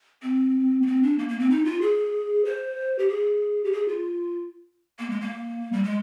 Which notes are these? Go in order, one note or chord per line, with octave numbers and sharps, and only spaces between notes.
C4
A#3
C4
D4
A#3
A#3
C4
D#4
F4
G#4
C5
G4
G#4
G4
G#4
F4
A#3
G#3
A#3
G3
G#3